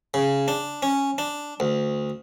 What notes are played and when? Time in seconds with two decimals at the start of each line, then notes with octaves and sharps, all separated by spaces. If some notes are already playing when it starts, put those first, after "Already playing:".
0.14 C#3
0.48 D4
0.83 C#4
1.18 D4
1.60 D2